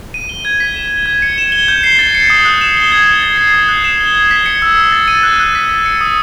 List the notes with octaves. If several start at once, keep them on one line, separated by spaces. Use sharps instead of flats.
D#7
G7
G#6
B6
E7
G7
G#6
C#7
E7
G7
G6
C7
A6
C#7
D#6
F#6
E7
G7
G#6
C#7
A6
C7
D#6
F#6
E7
G7
G#6
B6
C#7
E6
E6
A6
D#7
F#6
F#6
B6
A6
C#7
D#6